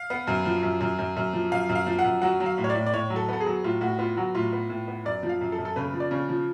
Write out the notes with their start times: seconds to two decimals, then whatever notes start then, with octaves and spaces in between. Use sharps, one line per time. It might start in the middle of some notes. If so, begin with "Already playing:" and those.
Already playing: F5
0.10 B3
0.27 F#2
0.45 F3
0.63 F#2
0.80 F#2
0.98 F#2
1.16 F#2
1.33 F3
1.51 F#2 F5
1.69 F#2
1.75 F5
1.87 F3
1.99 F#5
2.04 F#2
2.22 F#3 F#5
2.40 F#3
2.46 F5
2.58 A2
2.64 C#5
2.70 D5
2.75 A2
2.86 D5
2.93 A2 C#5
3.10 F#3
3.16 A4
3.29 B3 A4
3.40 G#4
3.46 F#3
3.64 A2 F4
3.81 A2 F#4
3.98 B3 F4
4.17 F#3 F#4
4.35 A2 F4
4.53 B3
4.70 A2
4.88 B3
5.05 F#2 D5
5.23 F3
5.29 F5
5.41 F#2
5.52 A4
5.58 F#2
5.65 A4
5.76 C#3 B4
5.93 F3
6.00 D5
6.11 C#3
6.29 F3